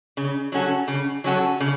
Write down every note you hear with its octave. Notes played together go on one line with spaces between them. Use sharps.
C#3
F#3 C#4 F#4 A4
C#3
F#3 C#4 F#4 A4
C#3